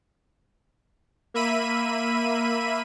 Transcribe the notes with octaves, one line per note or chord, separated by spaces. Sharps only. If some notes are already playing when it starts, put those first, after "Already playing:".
A#3 E5 B5 D#7